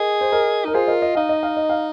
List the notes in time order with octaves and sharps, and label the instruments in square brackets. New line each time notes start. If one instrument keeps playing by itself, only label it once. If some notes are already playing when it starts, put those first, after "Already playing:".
Already playing: [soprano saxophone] G#4 [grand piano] A#4 D#5
[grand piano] C5
A#4 D#5
[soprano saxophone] D#4 [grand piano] A#4
[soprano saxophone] F4 [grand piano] G#4 C5
[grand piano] A#4 D#5
D#5
[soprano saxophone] D#4 [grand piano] F5
[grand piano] D#5
F5
D#5
F5